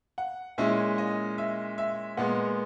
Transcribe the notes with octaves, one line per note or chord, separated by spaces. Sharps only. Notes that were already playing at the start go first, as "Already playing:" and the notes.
F#5
A#2 G#3 C#4 E4 E5
D#5
E5
E5
A#2 G#3 B3 F#5